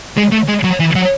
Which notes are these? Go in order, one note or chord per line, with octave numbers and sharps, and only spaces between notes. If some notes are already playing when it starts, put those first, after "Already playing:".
G#3
A3
G#3
F#3
E3
F#3